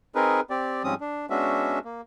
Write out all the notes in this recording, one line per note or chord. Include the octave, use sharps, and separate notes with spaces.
C4 D#4 G#4 A#4 B4
C4 G4 D5
G#2 F3 G3 C4 C#4 D#6
D4
G#3 B3 C#4 D4 F#4 E5
A#3